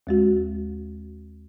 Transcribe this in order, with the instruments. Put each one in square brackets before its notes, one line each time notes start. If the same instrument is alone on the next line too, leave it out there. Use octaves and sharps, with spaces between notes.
[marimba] D#2 G#3 F#4